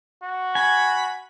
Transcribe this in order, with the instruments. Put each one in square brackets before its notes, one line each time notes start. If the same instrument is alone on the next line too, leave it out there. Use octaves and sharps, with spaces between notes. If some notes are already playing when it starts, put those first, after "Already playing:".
[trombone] F#4
[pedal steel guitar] G#5 [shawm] B5